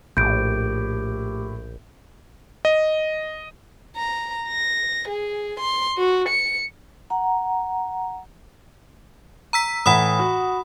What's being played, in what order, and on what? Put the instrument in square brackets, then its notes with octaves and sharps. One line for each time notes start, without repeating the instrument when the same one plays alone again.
[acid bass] A#1 [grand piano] A2 [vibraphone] A3 G4 D6 [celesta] G6 D7
[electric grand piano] D#5
[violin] A#5
A#6
G#4
C6
F#4
C#7
[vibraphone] F#5 A#5
[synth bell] A#5 E6 B6
[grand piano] A2 E3 [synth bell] F#5 B5 D#6
[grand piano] F#4